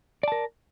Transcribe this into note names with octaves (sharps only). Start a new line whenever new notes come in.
A#4 D5 A5